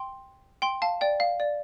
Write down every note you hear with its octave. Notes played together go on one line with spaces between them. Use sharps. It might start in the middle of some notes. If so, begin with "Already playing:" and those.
Already playing: G5 C6
G5 C6
F5 A5
D5 G5
F5
D5